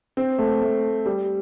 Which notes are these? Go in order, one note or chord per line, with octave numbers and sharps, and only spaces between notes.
C4
A3
A3
G3